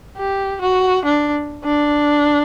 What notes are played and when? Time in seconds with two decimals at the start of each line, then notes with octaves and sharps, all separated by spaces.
0.17 G4
0.61 F#4
1.05 D4
1.64 D4